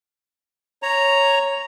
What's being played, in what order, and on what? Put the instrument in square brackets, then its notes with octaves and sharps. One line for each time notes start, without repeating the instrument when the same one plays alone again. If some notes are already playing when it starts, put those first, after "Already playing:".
[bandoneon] C#5 A#5